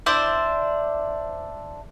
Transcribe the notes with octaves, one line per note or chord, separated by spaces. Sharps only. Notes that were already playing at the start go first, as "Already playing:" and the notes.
D4 E4 C5 D5